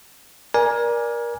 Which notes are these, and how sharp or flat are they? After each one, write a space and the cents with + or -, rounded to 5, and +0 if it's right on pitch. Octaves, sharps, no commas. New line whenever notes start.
A#4 +25 D5 +0 G#5 +0